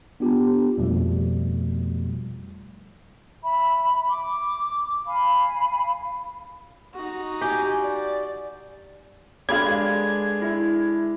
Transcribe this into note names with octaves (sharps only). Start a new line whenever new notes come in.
B3 D4 F4 G4
F2 B2 F3 G3 A3
E5 B5
D6
F5 G#5 B5
D#4 F#4
G4 G#5
D5
G#3 D4 G4 A4 B4 F5 B5 G#6
E4 E5